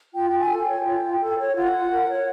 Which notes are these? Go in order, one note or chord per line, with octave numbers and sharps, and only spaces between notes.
F4 G5
F4 G5
G#5
A4
G5
C#5
F4
F4
A4
C#5
F4 F#5
F4
A#4
C#5